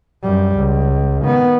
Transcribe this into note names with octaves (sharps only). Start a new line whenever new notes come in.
F#2 G3
C#2
D#3 B3